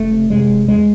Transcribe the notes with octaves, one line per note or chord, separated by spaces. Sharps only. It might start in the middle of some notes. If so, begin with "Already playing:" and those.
Already playing: F1 A3
C3
C3 G#3
F1
E2 G#3